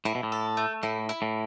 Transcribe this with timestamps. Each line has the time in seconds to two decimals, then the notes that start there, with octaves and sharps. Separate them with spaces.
0.05 A2 E4
0.15 B2
0.23 A2
0.32 A4
0.57 A3
0.83 A2 E4
1.09 E4
1.22 A2